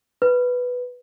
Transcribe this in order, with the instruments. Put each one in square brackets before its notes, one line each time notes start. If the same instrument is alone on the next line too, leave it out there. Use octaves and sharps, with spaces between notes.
[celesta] B4